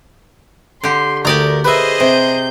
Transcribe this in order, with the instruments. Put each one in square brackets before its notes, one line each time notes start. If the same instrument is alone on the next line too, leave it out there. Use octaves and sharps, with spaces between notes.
[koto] D3 G4 [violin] C6
[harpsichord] D2 D#6 [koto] G4 D5 A#5 [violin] A#4
[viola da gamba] G#4 C5 D#5 [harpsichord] B4 E5
[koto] C3 [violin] C4 G6